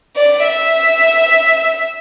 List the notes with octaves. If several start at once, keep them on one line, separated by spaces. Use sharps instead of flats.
D5
E5